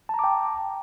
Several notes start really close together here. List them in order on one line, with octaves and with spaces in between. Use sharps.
A5 A#5 D6 G5